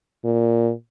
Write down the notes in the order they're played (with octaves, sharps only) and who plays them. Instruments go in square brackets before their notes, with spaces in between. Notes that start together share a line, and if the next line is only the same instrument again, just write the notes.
[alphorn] A#2